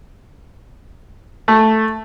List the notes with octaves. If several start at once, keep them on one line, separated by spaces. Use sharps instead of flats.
A3